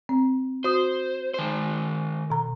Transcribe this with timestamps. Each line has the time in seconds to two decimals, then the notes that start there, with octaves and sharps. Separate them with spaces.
0.09 C4
0.64 F#4 C5 D#6
1.34 D#3 C5
2.30 B2 A#5